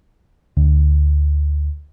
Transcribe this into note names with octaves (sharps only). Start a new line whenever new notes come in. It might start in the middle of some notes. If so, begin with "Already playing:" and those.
D2